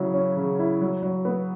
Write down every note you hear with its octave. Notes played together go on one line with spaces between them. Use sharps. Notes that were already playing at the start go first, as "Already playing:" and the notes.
Already playing: C#3 F#3 E4
C#4
C#3
E4
F#3
F#3
B3